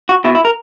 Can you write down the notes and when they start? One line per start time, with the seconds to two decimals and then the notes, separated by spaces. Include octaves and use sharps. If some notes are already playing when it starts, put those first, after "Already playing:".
0.09 F#4
0.25 B2 E4
0.35 E4
0.45 A#4